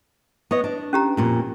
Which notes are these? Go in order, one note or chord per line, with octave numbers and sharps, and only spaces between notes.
B3 C#5 D#5
D4
C#4 G4 A#5
F2 A#2